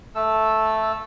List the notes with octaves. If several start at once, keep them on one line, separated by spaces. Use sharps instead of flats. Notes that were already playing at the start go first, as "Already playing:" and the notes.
A3 A4 E6